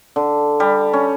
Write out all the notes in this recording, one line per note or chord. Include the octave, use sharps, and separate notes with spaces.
D3
G3
C#4